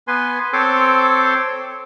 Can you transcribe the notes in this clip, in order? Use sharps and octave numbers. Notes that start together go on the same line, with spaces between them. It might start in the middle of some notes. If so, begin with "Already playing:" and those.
B3 B4 G#5 C6
C4 A4 C5 C#5 C6 D6